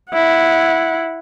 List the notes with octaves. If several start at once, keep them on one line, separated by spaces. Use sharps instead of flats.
E4 F#5